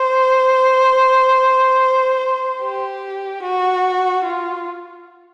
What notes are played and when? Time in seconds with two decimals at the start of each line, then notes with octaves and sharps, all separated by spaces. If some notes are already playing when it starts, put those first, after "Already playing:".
Already playing: C5
2.62 G4
3.43 F#4
4.24 F4